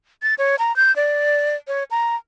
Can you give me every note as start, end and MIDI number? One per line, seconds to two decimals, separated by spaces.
0.22 0.34 93
0.38 0.56 73
0.59 0.75 82
0.76 0.94 91
0.96 1.56 74
1.68 1.84 73
1.91 2.16 82